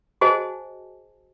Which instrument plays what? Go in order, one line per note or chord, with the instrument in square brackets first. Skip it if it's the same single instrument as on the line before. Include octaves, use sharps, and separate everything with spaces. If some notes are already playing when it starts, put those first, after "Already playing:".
[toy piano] F#4 G#4 C5 D#5 G#5 A5